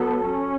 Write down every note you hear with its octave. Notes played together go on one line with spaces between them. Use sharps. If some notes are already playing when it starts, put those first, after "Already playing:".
Already playing: F#3 B3 A4
C#4